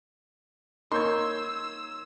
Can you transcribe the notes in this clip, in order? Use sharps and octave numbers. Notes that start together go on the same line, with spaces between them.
A#3 D#4 C#5 C6 E6 G6 G#6